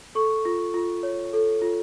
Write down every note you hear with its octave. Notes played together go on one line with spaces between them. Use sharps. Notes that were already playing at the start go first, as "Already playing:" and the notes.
A4 C#6
F4
F4
C#5
A4
F4